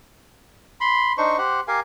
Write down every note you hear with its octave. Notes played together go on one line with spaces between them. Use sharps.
B5 C6
D4 D#4 C5 C#6
G4 C5 F#5
G4 A#4 F5 G#5